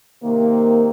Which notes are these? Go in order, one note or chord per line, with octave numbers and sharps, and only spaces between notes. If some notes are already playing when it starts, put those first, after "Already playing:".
C3 D#3 A#3